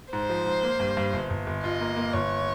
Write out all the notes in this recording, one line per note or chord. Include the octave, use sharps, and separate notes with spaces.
G#2 C5
F3
G#2
A#3
G2
G2
G1
G1
G1
F4 D#5
A#3
A#3
G1 C#5